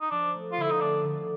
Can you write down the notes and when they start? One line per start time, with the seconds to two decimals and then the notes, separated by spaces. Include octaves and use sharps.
0.01 D#4
0.11 F3 D4
0.34 A3
0.52 F4
0.57 D3 E4
0.71 D#4
0.80 A3 D4
1.04 D3